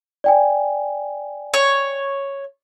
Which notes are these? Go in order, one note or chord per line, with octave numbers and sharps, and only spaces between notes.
D5 G5 G#5
C#5